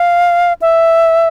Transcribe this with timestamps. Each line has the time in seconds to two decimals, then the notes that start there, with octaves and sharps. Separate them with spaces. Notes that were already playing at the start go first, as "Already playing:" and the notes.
Already playing: F5
0.62 E5